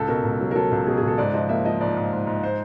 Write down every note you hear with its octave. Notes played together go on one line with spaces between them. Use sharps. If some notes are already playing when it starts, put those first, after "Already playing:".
Already playing: C#2 A4
B2 A#4
C#2
F#3
A#4
F#3 A4
C#2
B2 G#4
G#4
C#2
A4
G#2 D5
F3 D#5
A#3 E5
F3 D#5
G#2 D5
G#2
G#2
G#2
C5